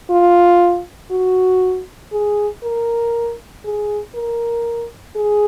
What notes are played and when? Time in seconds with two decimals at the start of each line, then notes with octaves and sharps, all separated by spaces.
0.10 F4
1.11 F#4
2.12 G#4
2.63 A#4
3.65 G#4
4.15 A#4
5.16 G#4